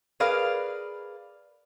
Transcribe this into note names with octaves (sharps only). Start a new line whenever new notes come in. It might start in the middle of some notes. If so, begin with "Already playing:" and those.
G#4 A#4 B4 D5 F5